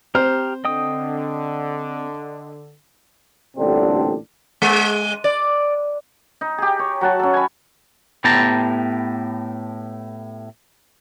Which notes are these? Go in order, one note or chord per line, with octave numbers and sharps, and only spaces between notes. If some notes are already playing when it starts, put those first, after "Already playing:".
C4 G4 C5 A#5 F6
D3 D#5 G5 D#6
A1 A#2 D3 G3 C4 D4
G#3
D5
D#4
G4 G#4
C#5
F#3 F#5 A5
C#4 A4
G#5 B5
A2 B3 G4 G5 A5 A#5